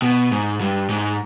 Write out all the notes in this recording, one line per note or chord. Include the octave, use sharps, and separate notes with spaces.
B2
G#2
G2
G#2